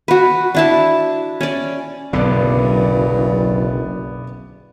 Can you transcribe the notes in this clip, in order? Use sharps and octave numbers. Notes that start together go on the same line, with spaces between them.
F#4 B4
D4 E4 A5
C#4 D5
F#1 B1 G2 D3 B3 D5